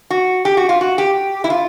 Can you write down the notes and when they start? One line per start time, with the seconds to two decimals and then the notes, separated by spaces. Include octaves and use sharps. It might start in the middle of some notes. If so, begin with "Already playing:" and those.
0.10 F#4
0.45 G4
0.57 F#4
0.69 F4
0.81 F#4
0.98 G4
1.44 E4
1.50 F4